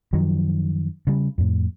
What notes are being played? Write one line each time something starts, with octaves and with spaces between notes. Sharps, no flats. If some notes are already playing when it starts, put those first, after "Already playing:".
F#2 D#3 F3 F#3
C#3 G3
F2 A2